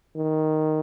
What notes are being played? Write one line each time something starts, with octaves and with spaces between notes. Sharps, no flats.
D#3